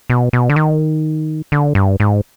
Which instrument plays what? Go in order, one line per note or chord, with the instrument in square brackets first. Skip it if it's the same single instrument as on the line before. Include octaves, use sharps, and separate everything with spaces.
[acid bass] B2
B2
D3
D#3
D3
G2
G#2